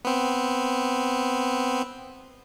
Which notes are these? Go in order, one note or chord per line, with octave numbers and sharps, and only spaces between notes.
B3 C4